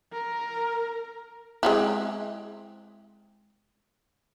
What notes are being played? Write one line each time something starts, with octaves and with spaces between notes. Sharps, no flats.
A#4
G#3 C4 E4